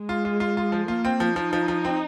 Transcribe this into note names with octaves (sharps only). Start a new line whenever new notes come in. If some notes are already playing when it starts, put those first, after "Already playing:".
Already playing: G#3
F4
F4
F4
F4
F3
A#3 F4
C4
F3
F3 D#4
F3
F3
C4